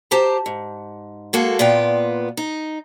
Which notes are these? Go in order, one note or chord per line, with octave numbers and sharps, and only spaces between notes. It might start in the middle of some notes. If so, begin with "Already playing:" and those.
G4 C5 A5 A#5
G#2
G#3 A#3 F#4 A4
A#2 B3 F4 B4 G5
D#4